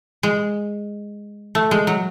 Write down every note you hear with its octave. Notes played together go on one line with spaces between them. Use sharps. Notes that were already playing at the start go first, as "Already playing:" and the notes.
G#3
A3
G#3
F#3